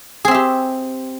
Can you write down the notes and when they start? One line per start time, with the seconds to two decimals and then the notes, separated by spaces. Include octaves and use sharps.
0.25 G#4
0.28 C4
0.31 E5
0.34 G4